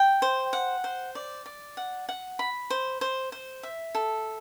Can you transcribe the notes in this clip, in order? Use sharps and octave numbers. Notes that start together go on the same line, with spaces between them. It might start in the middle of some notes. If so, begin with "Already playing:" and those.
Already playing: G5
C5
F#5
C5
D5
D5
F#5
F#5
B5
C5
C5
C5
E5
A4